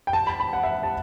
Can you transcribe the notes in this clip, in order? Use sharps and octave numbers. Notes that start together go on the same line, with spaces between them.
G5
A5
B5
B5
F#5
E5
A5